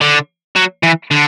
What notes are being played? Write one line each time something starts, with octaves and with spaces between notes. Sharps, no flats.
D3
F#3
E3
D3